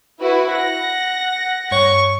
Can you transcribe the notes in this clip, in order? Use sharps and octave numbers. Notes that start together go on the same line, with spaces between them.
E4 F#4 B4
F#5 A#6
G2 C#5 C#6